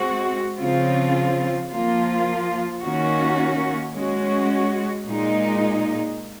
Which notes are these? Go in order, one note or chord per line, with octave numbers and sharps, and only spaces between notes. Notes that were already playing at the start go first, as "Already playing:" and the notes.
Already playing: G#3 C4 F#4
C#3 F3 C4 F4
F3 A#3 F4
D#3 A#3 C#4 F#4
G#3 C#4 F#4
A#2 G#3 D#4